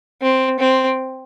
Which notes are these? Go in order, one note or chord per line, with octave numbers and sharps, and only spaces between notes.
C4
C4